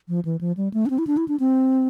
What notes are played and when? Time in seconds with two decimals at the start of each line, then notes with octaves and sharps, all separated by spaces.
0.09 F3
0.25 E3
0.41 F3
0.57 G3
0.74 A3
0.86 D4
0.90 C4
0.98 E4
1.07 D4
1.17 E4
1.28 D4
1.40 C4